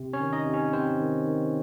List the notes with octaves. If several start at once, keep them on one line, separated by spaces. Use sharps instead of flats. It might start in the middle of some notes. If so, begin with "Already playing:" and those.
Already playing: C3
C#4 C#5
D#3
D#4 D#5
C3
C#4 C#5
C3 C4 C5
D#3
D#3